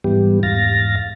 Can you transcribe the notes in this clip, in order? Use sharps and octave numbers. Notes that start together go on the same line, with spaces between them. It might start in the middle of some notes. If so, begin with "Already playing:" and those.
G#2 E3 G3 B3 G4
E2 G#2 F5 A6 A#6